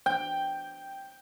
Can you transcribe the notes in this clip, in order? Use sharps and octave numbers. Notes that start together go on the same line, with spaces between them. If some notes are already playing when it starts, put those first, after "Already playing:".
G5